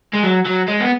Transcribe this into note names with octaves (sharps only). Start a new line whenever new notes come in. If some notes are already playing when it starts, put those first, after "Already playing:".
G#3
F#3
F#3
G#3
B3